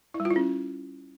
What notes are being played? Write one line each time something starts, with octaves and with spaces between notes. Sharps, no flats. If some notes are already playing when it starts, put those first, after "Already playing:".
E4
G3
F4
E4
C#4